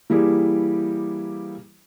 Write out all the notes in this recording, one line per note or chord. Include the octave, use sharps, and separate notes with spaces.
E3 G3 A#3 E4 G4 G#4